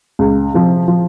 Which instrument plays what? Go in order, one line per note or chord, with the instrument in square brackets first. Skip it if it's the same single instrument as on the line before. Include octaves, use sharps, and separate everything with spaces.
[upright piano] C#2
C3 F3
F3